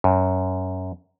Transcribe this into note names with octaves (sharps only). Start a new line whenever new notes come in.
F#2